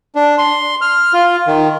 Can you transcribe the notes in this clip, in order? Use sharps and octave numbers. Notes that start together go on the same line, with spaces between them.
D4
C6
F6
F4
D#3